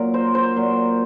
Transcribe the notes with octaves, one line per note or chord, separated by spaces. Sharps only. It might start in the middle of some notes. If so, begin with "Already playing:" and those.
Already playing: A#2 F#3 A#4
C5
C5
A#2 F#3